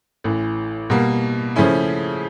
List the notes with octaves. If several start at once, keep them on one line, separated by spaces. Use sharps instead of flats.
A1 A2 E3
B2 G3 A#3
C#3 F3 A3 C#4 E4